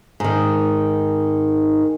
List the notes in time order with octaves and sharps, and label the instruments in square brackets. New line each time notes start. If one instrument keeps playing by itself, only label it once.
[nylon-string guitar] G#2 D#3